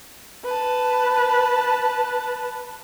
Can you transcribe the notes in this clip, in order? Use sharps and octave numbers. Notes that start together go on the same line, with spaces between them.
B4 A5